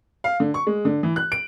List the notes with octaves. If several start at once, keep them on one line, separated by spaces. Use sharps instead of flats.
F5
D3
C#6
G#3
D3
E3
F#6
D7